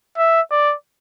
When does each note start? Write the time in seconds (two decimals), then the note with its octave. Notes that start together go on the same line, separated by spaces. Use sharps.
0.17 E5
0.51 D5